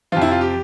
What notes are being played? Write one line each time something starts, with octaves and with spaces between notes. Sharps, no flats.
F2 C3 F3 F4
E4
F4
G4